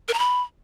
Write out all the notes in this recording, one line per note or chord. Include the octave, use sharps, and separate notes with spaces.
A#4
A#5
B5